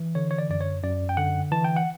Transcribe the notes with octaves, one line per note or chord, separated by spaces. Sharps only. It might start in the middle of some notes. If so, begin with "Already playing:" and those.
Already playing: E3
D3 C#5
C#5
D5
F#2 D5
C#5
F#2 D5
G5
D3 F#5
E3 A5
G5
F#5